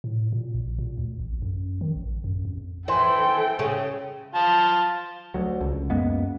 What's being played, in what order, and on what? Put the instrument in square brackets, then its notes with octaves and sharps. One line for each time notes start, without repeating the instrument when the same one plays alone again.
[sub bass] A2
A#2
A#1
A#2
D2
A1
F#2
D#3
A1
F#2
F2
[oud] E3 [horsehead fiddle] A4 G5 [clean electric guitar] C5
[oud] C#3
[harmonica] F4 A5
[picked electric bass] D2 F#3
C#2
F#2 G#3 A#3 B3